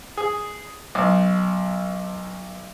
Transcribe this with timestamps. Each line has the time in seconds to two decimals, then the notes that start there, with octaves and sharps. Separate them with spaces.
0.17 G#4
0.95 B1